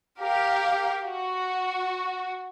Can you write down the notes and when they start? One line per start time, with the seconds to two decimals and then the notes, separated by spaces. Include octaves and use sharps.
0.18 G4 A#4 F5
1.06 F#4